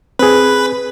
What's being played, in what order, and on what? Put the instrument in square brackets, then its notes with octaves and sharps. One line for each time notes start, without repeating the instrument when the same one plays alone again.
[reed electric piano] C4 G#4 [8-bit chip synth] B4